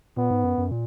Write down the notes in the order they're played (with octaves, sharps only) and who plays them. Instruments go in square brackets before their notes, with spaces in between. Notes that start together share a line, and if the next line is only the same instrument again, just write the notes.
[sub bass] A#2 [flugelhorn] B3
[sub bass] G#2
F#2
F#2
A#2